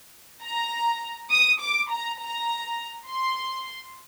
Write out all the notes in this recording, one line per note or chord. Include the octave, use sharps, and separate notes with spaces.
A#5
D#6
D6
A#5
A#5
C6